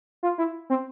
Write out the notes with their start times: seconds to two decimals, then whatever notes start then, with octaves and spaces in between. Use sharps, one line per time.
0.23 F4
0.38 E4
0.70 C4